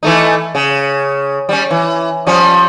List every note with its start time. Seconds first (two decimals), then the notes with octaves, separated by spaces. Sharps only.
0.03 E3 A3 D#4
0.55 C#3
1.49 G3 C#4
1.71 E3
2.27 F3 G3 C#4